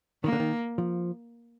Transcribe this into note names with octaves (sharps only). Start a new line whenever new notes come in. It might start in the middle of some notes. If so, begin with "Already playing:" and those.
D#3 A#3
D3
D#3
F3